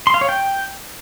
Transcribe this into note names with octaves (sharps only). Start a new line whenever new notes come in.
C6
F5
C#5
G5